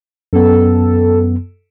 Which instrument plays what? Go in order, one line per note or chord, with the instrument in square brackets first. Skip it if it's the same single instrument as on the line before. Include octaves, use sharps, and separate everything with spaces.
[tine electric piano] F#2 B3 [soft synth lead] A4